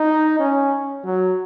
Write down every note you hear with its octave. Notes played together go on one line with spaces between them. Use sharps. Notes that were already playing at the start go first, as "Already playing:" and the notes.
Already playing: D#4
C#4
F#3